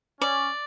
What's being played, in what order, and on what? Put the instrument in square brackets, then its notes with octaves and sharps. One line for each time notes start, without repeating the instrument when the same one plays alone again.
[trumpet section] C#4 [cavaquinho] D5